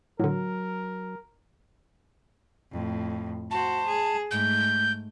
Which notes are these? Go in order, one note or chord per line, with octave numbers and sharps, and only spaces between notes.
A2 D3 F#3 A#4
F2 A2
F#4 C5 A5
G#4
G#2 A3 G6